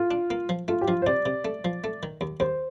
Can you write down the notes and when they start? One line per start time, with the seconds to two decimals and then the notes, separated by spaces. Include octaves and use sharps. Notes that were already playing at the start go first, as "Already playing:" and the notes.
Already playing: A2 F4
0.11 D4
0.30 A#3
0.49 F3
0.68 A3 F4
0.81 G4
0.88 F3 F4
1.02 C5
1.06 C3 D5
1.26 C3
1.45 A3
1.65 F3
1.84 A3
2.03 D#3
2.21 D#2
2.40 D#2 C5